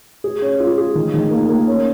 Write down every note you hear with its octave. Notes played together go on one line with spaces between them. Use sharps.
G#4
C#4
F4
G#4
D#3
D#3
A#3
A#3
C#4